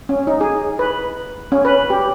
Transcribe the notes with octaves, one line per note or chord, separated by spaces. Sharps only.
C#4
D#4
G#4
B4
C#4
B4
G4